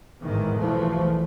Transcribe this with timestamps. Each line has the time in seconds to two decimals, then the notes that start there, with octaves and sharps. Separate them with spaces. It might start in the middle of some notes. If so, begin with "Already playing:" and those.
0.23 A1 E2 G#2 D#3 E3
0.56 B1 E2 E3 F3 A3